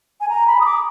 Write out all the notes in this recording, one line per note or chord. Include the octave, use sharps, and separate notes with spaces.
G#5
A#5
B5
D#6
D6